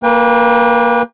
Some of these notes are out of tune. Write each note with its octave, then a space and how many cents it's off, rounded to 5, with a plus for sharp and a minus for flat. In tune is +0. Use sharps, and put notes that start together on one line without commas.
A#3 +0 B4 -30 G5 +25